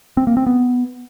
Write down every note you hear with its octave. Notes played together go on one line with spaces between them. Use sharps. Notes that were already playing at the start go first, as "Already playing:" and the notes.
C4
A#3
C4
B3